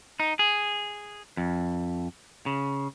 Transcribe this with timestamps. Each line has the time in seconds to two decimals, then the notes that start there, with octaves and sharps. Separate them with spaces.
0.20 D#4
0.39 G#4
1.37 F2
2.46 C#3